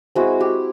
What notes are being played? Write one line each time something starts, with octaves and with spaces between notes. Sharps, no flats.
G#3 C4 E4 F#4
G4